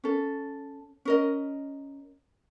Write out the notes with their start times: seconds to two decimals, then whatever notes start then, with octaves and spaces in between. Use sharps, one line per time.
0.04 C#4 A4
1.05 C#4 A#4 D#5